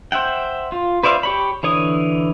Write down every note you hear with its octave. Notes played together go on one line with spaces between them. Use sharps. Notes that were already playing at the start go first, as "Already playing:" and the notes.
C5 E5 F#5 G5
F4
B4 C5 D5 E5 F5
G4 C#5 B5
D3 E3 C#5 D#6